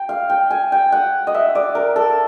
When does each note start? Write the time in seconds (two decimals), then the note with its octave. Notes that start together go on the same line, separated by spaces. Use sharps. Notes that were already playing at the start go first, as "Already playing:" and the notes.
Already playing: G5
0.09 F5
0.30 G5
0.50 G#5
0.72 G5
0.92 F#5
1.27 D#5
1.34 E5
1.55 D5
1.75 A#4
1.96 A4